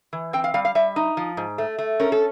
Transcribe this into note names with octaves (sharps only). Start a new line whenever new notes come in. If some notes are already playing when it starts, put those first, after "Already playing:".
E3
C4 G5
F5
G3 F5
F5
G3 E5
D#4
F3
G#2
A3
A3
C#4 A#4
A4